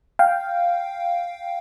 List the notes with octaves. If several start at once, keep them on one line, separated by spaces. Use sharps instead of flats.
F5 G5